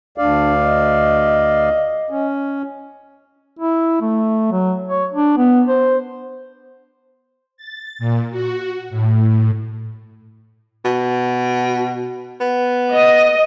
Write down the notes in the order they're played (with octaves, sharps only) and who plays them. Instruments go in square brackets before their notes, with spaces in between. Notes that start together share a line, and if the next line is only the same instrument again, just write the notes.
[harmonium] D2 D5 F5 [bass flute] D4
[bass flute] D#5
[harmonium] C#4
[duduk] E4
A3
F#3
C#5
D4
B3
C5
[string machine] A6
A#2
F#4
A2
[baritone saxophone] B2
B3
[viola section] D#5